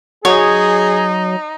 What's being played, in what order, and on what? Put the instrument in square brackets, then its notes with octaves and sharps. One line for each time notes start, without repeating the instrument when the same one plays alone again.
[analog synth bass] F#3 [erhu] D#4 [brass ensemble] G#4 [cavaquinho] C#5